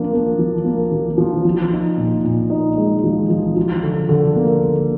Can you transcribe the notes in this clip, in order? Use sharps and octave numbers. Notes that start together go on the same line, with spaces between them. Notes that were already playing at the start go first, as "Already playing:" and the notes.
Already playing: F3 A#3 D4
A#3
F3
A#3
F3
F3
F3
D#4
A#2
A#2
D#4
G#3
F3
F3
F3
D3
D3
A#3
D3